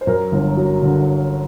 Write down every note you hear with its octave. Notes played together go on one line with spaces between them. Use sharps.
C5
F#2 A#4
G1
F#3
D3